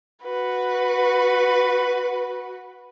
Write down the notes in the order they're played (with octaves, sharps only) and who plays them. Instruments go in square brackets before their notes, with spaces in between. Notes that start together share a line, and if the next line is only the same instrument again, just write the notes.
[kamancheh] F#4 B4